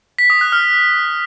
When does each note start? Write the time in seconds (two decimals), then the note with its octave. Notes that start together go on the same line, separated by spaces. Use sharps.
0.19 B6
0.30 D#6
0.41 F#6
0.52 F6